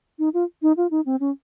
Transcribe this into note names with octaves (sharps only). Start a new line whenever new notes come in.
D#4
F4
D#4
F4
D#4
C4
C#4